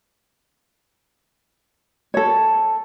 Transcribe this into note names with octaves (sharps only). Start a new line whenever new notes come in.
A4 C#5